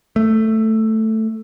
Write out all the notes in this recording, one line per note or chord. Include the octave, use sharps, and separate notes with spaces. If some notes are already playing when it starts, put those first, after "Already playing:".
A3